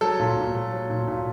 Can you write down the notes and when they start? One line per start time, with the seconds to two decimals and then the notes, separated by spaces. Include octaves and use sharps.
0.01 F#3 A4
0.20 A#2
0.36 A#2
0.54 F#3
0.72 F#3
0.90 A#2
1.08 A#2